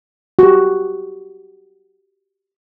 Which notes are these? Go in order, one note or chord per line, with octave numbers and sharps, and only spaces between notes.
F#4 G4